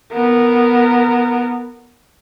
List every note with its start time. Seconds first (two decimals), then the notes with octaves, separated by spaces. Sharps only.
0.13 B3 A#4